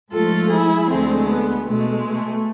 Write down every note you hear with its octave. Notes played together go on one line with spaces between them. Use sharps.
G#2 F3 A3 F4 A4
E4 G#4
D2 D3 G#3 A3 C4
B3
B2 G#3 A3
A3